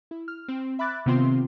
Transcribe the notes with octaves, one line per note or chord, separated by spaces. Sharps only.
E4
F6
C4
E5 B5 D6 F#6 A6
C3 D#3 B3 C4 F4 C6